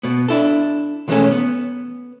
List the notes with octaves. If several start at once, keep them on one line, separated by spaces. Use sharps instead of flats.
B2 B3
D4 E4 A4
B1 E3 G#3 A3 C#4 A4
B3